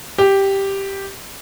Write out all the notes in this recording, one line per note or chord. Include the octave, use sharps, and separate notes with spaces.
G4